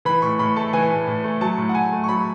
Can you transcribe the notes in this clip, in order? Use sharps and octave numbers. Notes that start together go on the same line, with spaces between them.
E3 B5
A2 C#6
A2 B5
A3 A5
E3 G#5
A2
A2
A3
F#3 A5
A2
F#5
A2 G#5
A3
C#6
F#3 B5